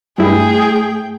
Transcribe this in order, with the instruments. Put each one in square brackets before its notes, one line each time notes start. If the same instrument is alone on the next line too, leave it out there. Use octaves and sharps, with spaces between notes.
[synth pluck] G2 E4 [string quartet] A3 G5 [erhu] G#4